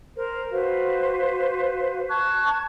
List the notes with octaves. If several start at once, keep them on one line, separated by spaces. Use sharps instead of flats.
A#4 C5
F#4 B4 C5 F5
A5 C#6 F#6 G#6